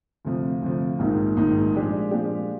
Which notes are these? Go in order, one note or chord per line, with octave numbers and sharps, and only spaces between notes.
D2 C3 F3
D2 C3 F3
A#1 G#2 D#3 A#3 D#4
A#1 G#2 D#3 A#3 D#4
A#2 F3 G#3 D4 G4
A#2 F3 G#3 D4 G4